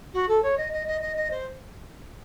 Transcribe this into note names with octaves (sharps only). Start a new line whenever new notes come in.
F#4
A4
C#5
D#5
D#5
D#5
D#5
D#5
C5